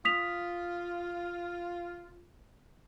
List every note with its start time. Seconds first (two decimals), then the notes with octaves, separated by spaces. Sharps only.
0.05 F4 D#6 B6 F7